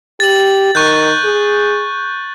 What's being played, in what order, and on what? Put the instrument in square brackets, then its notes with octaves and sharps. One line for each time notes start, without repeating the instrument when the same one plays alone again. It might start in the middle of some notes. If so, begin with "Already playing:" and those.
[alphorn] G4 [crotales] A6 F#7
[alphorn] D#3 [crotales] C#6 F#6 G6
[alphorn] G#4